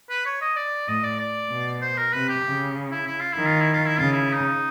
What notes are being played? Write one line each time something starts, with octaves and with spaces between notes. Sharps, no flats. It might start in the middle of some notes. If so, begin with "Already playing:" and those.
B4
C#5
D#5
D5
A2 D#5
D5
D5
B2
C5
A#4
C3 B4
G4
C#3
E4
E4
F4
E4
D#3
F4
E4
F4
E4
C#3 F4
E4
D#4